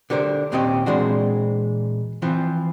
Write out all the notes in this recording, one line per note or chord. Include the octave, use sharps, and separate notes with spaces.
D3 G4 A#4 C5
D#2 A#2 C4 C#4 G4 D#5
A#2 E3 G#3 C4 D4 F#4
E3 F3 C4